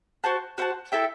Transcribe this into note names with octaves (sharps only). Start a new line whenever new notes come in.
F#4 C5 F#5 A5
F#4 C5 F#5 A5
E4 A4 E5 G5